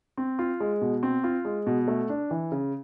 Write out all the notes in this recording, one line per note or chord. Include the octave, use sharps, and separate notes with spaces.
C4
F4
G#3
B2
C4
F4
G#3
B2
A3
D4
E3
C#3